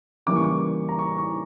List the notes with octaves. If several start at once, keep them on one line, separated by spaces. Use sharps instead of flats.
C#3 E3 G3 A#3 D6
C#6
D6
A#5
C#6
C#6